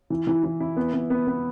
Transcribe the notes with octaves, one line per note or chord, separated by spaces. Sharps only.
E3
E3
E3
E4
B3
B3
B3
B3